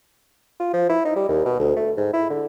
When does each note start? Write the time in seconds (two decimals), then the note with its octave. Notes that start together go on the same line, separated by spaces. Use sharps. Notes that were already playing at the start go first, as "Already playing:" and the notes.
0.60 F4
0.74 F3
0.89 E4
1.05 D#4
1.16 G3
1.29 D#2
1.45 B2
1.60 D2
1.77 A3
1.97 G#2
2.13 E4
2.30 D3